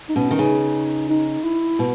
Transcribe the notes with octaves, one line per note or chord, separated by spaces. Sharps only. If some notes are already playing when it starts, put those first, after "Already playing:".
D#4
B2 C#4
D#3 C#4
C#3 D#4
D#4
E4
B2